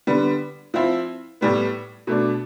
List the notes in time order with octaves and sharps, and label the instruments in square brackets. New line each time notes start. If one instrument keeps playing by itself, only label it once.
[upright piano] D3 G3 B3
F3 C4 E4
A2 G3 B3
B2 A3 D4